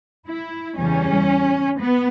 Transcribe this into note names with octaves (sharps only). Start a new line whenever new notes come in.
E4
E2 C#3 G3 C#4
B3